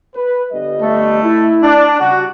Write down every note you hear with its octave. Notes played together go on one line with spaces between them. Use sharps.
B4
G1 G3 D#5
A3
E4
D4
C#3 G3 F#4